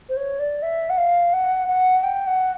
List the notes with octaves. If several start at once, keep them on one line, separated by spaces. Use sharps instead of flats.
C5
C#5
D5
E5
F#5
F5
F#5
F#5
G5
F#5